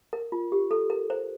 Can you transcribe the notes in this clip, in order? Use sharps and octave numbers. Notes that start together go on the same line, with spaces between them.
A#4
F4
G4
A4
A#4
C5